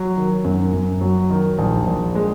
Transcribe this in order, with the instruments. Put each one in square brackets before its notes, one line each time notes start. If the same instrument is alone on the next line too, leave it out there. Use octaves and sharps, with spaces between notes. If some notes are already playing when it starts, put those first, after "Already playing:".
Already playing: [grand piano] F#3
D#3
F#2
F#2
F#3
D#3
A#1
A#1
G#3